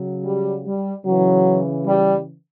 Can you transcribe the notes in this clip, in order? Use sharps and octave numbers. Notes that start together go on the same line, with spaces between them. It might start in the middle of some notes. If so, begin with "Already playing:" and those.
Already playing: C#3 F#3
G3
G3
C#3 E3 F#3
G3